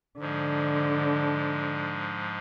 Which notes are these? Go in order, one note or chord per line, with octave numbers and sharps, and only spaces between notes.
G#2 D3 F3 G#3